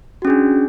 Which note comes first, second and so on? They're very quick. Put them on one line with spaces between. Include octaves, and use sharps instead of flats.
F#4 C#4 G#4 D4